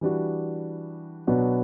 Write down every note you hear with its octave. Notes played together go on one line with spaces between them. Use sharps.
E3 G3 D4 F#4
B2 F#3 B3 D4 F#4